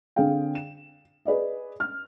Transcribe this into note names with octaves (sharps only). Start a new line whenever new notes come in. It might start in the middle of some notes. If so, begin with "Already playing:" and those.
D3 C4 G#4 F5 G5
E7
G#4 B4 D5 D#5
F6